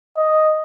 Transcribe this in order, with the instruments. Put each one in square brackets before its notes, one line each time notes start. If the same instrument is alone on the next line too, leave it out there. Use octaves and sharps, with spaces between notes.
[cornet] D#5